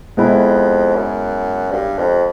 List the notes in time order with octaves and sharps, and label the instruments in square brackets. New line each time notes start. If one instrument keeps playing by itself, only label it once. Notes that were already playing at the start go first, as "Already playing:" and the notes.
[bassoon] F2 [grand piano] G#3 B3 E4
[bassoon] F#2
G2
F2